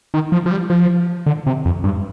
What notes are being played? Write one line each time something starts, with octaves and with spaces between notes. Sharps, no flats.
D#3
F3
F3
G3
F3
D3
C3
F2
G2